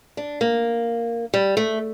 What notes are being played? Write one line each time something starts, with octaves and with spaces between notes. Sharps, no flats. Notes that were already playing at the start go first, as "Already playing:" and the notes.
D4
A#3
G3
A3